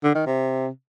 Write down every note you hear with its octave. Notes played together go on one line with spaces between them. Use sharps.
D3
D#3
C3